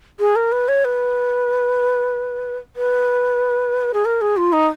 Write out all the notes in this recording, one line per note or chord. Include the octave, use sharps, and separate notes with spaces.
G#4
A#4
B4
C#5
B4
B4
G#4
A#4
G#4
F4
D#4